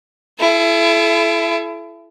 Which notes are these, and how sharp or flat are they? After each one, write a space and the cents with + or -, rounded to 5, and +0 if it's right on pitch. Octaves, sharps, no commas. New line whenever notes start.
E4 +30 A4 -35